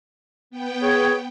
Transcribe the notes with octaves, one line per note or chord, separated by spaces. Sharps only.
B3 G5
G#4 C#5